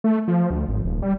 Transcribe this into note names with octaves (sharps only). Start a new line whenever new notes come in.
A3
F3
D2
G#1
D#1
G3